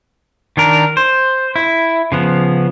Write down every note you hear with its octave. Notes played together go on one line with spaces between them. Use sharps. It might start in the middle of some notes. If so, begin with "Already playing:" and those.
D#3 D4 A#4
C5
E4
C#3 F3 B3